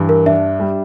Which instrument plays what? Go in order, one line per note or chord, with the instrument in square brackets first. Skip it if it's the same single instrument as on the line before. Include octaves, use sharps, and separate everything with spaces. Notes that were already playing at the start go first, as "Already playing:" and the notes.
Already playing: [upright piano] G2 E3
[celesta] A#4
[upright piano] D4 [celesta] E5
[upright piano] G3